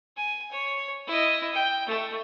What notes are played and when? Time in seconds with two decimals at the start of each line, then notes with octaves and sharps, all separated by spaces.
0.17 G#5
0.52 C#5
1.07 E4 D#5
1.54 G5
1.86 A3